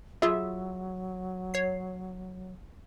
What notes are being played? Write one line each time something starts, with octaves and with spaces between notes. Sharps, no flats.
F#3 F4 G#4 E5
C#5 C7